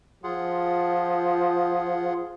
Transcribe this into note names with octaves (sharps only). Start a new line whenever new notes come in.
F3 F4 G#4 F#5